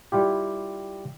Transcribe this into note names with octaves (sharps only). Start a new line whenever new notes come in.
G3 E4 F4 G4